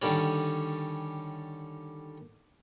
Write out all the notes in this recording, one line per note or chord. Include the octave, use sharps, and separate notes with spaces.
D3 D#3 G3 C#4